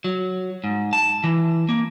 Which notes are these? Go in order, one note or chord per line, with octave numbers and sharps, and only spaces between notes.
F#3
G#2
A5
E3
A#3